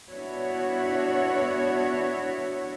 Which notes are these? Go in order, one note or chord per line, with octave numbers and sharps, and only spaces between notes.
B3 D4 E4 F#4 C#5